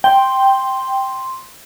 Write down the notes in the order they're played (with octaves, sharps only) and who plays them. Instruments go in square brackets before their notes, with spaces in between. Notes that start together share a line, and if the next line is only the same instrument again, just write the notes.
[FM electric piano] G5 [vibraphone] C6